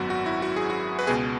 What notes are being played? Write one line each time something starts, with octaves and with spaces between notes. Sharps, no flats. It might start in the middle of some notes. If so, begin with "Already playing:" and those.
Already playing: G#1 F#2 F#3 B3 F#4
F#4
E4
F#4
G#4
F#4
B4
C#2 B2 B3 G#4